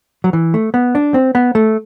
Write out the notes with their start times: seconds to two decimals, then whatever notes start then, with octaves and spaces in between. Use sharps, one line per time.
0.24 F#3
0.33 E3
0.54 A3
0.74 B3
0.95 D4
1.14 C4
1.35 B3
1.55 A3